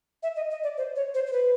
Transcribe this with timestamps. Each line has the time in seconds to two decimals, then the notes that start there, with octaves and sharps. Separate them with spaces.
0.23 E5
0.36 D#5
0.51 D#5
0.63 D5
0.78 C5
0.96 C#5
1.14 C5
1.27 C5
1.33 B4